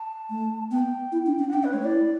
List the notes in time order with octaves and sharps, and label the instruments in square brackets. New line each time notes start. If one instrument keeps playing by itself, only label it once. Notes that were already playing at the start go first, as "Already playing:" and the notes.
Already playing: [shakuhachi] A5
[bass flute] A3
[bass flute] B3 [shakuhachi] G5
[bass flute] E4
D4
C#4
[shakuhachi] F#5
[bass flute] D4 [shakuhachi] G5
[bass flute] C#4 [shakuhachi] B4
[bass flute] A3 [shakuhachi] C#5
[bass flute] E4 [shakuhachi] D5